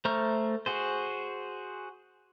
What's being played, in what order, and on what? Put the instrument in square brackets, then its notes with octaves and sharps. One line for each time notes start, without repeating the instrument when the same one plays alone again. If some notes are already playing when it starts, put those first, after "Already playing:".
[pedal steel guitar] A3 C5 A#5 C#6 F6
F#4 G#4 C5